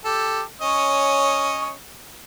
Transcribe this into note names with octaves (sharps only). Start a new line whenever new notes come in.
G4 A4
C#4 C#5 D#5